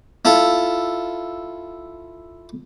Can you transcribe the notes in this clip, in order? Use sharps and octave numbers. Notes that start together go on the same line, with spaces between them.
E4 F4 A4